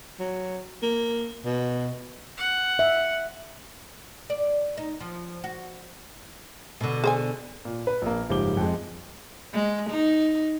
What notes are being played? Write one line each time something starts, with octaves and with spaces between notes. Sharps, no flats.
F#3
A#3
B2
F#5
E5
D5
D#4
F3
F#4
B2 D3
G#4 C5 G#5
A#2
B4
A#1 A#3
F#1 G#2 F3 G4 D6 G7
F2 G#3
G#3
D#4